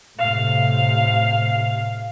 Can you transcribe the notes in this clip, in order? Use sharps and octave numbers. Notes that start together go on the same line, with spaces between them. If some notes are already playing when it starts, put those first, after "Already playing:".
A2 C3 F5